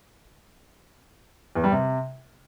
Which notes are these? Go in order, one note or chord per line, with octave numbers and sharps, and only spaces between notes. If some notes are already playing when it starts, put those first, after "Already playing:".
E2
G3
C3